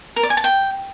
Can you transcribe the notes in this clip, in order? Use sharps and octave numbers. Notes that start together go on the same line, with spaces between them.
A#4
D5
G#5
A5
G5